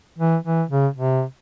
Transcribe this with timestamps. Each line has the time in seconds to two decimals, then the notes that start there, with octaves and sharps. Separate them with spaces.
0.18 E3
0.45 E3
0.70 C#3
0.96 C3